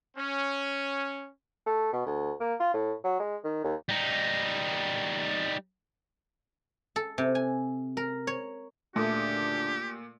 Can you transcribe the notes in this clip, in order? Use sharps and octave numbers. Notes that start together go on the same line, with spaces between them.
C#4
A3
B2
D2
A#3
F4
A2
F#3
G#3
D#3
D#2
G3 D#4
A4
C3
G#5
A#4
C#5
D2 A#2 C#3 A3 D4 G4 D6 D#6